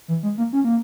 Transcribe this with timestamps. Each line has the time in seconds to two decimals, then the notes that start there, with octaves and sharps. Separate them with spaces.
0.08 E3
0.23 G#3
0.38 A#3
0.53 C#4
0.65 A#3